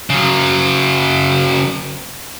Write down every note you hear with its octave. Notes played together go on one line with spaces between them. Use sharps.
C#3 F#3